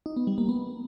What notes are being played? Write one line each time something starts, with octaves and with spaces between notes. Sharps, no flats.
D#4
B3
G3
A#3
B3